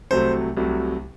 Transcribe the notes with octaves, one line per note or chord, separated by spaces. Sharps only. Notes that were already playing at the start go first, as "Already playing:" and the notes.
C2 C3 F#3 A3 C5
C2 C3 F#3 A3